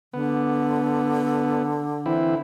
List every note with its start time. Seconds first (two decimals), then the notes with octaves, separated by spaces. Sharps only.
0.13 D3 B3
2.06 E3 C4 E4